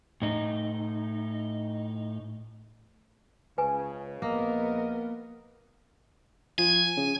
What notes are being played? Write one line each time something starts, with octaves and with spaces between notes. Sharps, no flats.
A2 D#4
C#2 C#3 B4 G#5
A#1 A#3 B3 A#4 D#5
F3 G#5
C#3